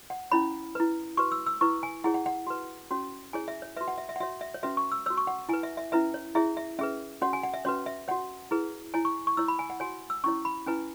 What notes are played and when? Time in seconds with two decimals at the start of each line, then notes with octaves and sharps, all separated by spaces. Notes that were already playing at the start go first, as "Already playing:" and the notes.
0.10 F#5
0.32 C#4 E4 C#5 B5
0.75 E4 B4
1.17 F#4 B4 C#6
1.32 E6
1.47 E6
1.61 E4 B4 C#6
1.83 G#5
2.04 E4 G#4 C#5 F#5
2.14 F#5
2.26 F#5
2.47 F#4 B4
2.91 C#4 F#4 C#5
3.33 E4 G#4 C#5 G#5
3.48 E5
3.62 C#5
3.77 F#4 B4 E5
3.88 F#5
3.98 E5
4.09 E5
4.16 F#5
4.20 F#4 C#5 E5
4.41 E5
4.54 C#5
4.63 C#4 F#4 B4 E5
4.77 C#6
4.92 E6
5.06 F#4 C#5 E6
5.17 C#6
5.27 F#5
5.49 E4 B4 G#5
5.63 E5
5.77 E5
5.92 C#4 E4 B4 E5
6.14 C#5
6.35 E4 G#4 C#5 E5
6.57 E5
6.79 C#4 G#4 B4 E5
7.22 C#4 F#4 C#5 F#5
7.33 G#5
7.43 F#5
7.54 E5
7.65 C#4 F#4 B4 C#5
7.86 E5
8.08 F#4 C#5 F#5
8.51 E4 G#4 B4
8.94 E4 C#5 G#5
9.05 C#6
9.27 C#6
9.37 E4 C#5 E6
9.48 B5
9.59 G#5
9.70 F#5
9.80 F#4 C#5 G#5
10.10 E6
10.24 C#4 E4 C#5 C#6
10.45 B5
10.67 C#4 E4 B4 G#5